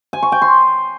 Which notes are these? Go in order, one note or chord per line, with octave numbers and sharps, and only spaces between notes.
G#5
C#6
G5
C6